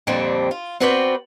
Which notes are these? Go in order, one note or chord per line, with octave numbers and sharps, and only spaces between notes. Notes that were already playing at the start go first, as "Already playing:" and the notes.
F2 A#2 D3 G3 C4 D4
F4
C4 F#4 B4 C5 D5 G5